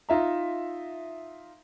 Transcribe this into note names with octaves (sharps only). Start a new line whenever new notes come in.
D#4 F4 E5 A#5